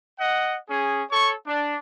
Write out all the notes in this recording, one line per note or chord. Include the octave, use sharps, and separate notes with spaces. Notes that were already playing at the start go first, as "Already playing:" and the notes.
D#5 F#5
C#4 G#4
A4 C#5 C#6
D4